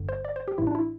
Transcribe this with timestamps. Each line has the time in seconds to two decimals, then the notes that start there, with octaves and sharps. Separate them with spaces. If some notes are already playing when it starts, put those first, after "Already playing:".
Already playing: G1 G2 D3
0.09 C5
0.25 D5
0.36 C5
0.48 G4
0.58 A1 A2 E3 E4
0.67 D4
0.75 E4